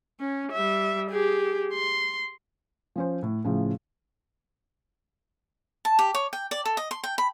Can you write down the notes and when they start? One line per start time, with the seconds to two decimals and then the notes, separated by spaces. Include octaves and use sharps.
0.20 C#4
0.52 G3 E5
1.10 G4 G#4
1.74 C6
2.96 F3 C#4 C5
3.23 A2
3.44 A2 C#3 F3
5.85 A5
5.99 G4
6.14 C#5
6.33 G5
6.51 D5
6.65 A4
6.77 D#5
6.91 C6
7.04 G5
7.18 B5